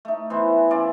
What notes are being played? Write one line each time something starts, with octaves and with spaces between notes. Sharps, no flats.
A3 D#4
E3 B3 E4 C5
C#4 F4 D5 E5